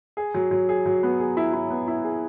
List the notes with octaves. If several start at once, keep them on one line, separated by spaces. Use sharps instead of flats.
G#4
F#3
F#3
G#4
F#3
B3
G#4
E4
E4
B3
E4
G#4